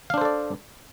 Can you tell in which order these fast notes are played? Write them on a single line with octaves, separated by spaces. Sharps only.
F5 D4 C5 A4 D5